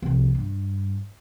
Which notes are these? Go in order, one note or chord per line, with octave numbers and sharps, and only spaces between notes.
C2 F3
G2